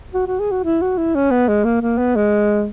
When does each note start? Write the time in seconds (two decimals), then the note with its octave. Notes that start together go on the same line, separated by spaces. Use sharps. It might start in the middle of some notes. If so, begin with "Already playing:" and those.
0.14 F#4
0.27 F#4
0.40 G#4
0.51 F#4
0.64 E4
0.82 F#4
0.97 E4
1.15 C#4
1.31 B3
1.48 G#3
1.64 A#3
1.81 A#3
1.98 B3
2.16 G#3